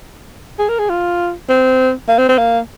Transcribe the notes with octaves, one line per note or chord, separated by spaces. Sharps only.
G#4
A#4
G#4
F4
C4
A#3
C4
C4
A#3